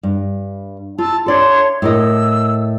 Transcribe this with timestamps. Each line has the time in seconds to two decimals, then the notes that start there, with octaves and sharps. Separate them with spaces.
0.03 G2
0.98 F4 A5 E6
1.26 D4 A4 C#5 D5 E5 C6
1.82 A2 A#4 D#5 E6